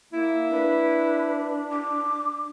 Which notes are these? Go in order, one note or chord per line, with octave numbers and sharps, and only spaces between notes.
A#3 E4
D4 B4
D6